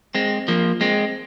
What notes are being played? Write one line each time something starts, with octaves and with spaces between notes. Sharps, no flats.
G#3 C4
F3 A#3
G#3 C4